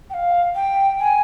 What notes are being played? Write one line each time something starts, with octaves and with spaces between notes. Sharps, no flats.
G5
F5
G5
G#5